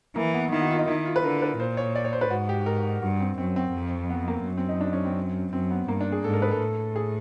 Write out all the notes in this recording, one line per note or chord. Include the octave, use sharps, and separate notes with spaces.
E3 A#3
B3
D#3 E4
F#4
F4
D#4
D#3 E4
F4
B4
D3 A#4
B4
A#2 C5
C#5
D5
C#5
C5
B4
G#2 F#4
G4
A#4
G2 F#4
C4
F#2 C4
C4
F2
B3
A#3
F#2
C4
D#4
D4
C#4
C4
F#2 C4
B3
G2 A#3
D4
G#4
G#2 A4
A#4
B4
A4
A2
G#4